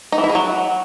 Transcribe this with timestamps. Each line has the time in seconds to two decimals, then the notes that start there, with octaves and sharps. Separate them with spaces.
0.12 D#4
0.18 E3
0.24 E4
0.29 G#4
0.35 F#3